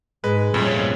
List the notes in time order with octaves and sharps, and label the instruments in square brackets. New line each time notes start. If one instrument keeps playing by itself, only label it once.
[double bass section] G#2 [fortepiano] G#3 [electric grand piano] B4
[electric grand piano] F2 [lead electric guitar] A#2 A3 [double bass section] F3 G3 C#4